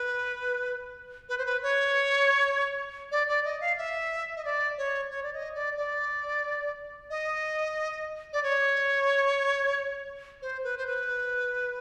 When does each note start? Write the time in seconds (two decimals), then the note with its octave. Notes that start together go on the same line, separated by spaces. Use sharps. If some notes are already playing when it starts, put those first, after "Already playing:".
Already playing: B4
1.29 B4
1.38 C5
1.46 B4
1.63 C#5
3.11 D5
3.28 D5
3.45 D#5
3.61 F5
3.78 E5
4.36 D#5
4.45 D5
4.78 C#5
5.11 C#5
5.23 D5
5.33 D#5
5.54 D5
5.77 D5
7.10 D#5
8.33 D5
8.43 C#5
10.42 C5
10.64 B4
10.78 C5
10.86 B4